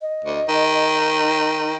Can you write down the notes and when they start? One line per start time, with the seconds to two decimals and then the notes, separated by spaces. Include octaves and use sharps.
0.01 D#5
0.25 D2
0.49 D#3
1.21 D#4